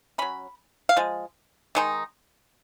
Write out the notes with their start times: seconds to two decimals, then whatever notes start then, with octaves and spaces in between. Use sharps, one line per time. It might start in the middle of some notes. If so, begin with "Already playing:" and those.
0.18 F#3 C#4 B5
0.89 F5
0.97 F3 G#3
1.75 D#3 G#3 D#4